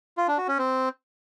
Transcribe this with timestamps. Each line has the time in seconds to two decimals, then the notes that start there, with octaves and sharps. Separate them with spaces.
0.17 F4
0.28 D4
0.38 F#4
0.48 C#4
0.58 C4